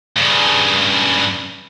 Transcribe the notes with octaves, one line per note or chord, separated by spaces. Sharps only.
G2 C#3